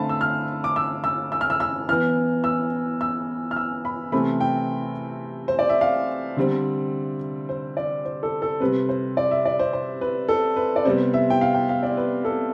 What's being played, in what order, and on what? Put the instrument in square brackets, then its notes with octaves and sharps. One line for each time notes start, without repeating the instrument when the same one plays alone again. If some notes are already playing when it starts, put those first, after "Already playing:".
Already playing: [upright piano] D3 A3 C4 F5 A5 B5
E6
F6
D6
E6
E6
E6
F6
E6
E6
E3 B3 F6
E6
E6
F6
E6
B5
C3 E3 A3 C4 B5
G5
C5
D5
E5
F5
D3 G3 C4
C5
D5
C5
A4
A4
C3 G3 C4 B4
C5
D5
E5
D5
C5
C5
B4
A4
B4
D5
C3 G3 B3 C5
E5
G5
F5
G5
F5
D5
B4
A4